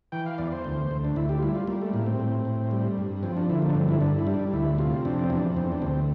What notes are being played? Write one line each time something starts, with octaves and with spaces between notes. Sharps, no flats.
E3 G5
F5
E2 D5
C5
D2
D2
D4
D2 E4
G4
F4
G3 E4
F4
G3 A#3
A3
A2 A#3
C4
A2
A2
G3
G2
F3 C4
D4
D3 E4
A#3
D4
G2 C4
E4
G2 D4
E4
G3 D4
D2 E4
C3 F4
F2 D4
C4
E2 D4
E2 C4
D4
D2 C4